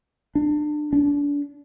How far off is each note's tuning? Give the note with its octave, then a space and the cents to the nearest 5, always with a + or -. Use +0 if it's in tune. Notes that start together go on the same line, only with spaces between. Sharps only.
D4 +25
D4 -35